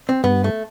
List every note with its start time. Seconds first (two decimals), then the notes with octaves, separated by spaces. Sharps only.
0.09 C4
0.24 G2 B3
0.44 A3